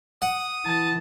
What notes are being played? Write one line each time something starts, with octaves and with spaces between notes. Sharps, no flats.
F#5 D#6
E3 A5